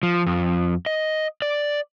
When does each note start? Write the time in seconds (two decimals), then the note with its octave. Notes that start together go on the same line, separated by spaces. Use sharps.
0.03 F3
0.26 F2
0.86 D#5
1.42 D5